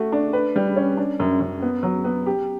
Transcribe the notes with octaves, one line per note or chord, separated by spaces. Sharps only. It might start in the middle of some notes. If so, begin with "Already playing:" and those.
Already playing: A3 F#4
D4
B4
G3
C#4
D4
F#2
F#2
B3
F#3
B3
G4